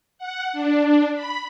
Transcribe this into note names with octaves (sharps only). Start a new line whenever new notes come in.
F#5
D4
B5